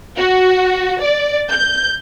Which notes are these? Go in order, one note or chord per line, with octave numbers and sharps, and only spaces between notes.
F#4
D5
G6